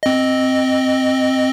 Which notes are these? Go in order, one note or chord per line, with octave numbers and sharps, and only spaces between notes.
C4 D#5